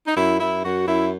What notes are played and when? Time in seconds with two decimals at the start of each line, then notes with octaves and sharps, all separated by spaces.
0.07 D#4
0.17 F#2 E4
0.40 F#2 E4
0.64 F#2 F#4
0.87 F#2 E4